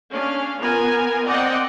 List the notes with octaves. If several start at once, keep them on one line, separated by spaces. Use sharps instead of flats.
C#4 D4 F5
B3 F4 A#4 G#5
C4 D5 D#5 F#5 G5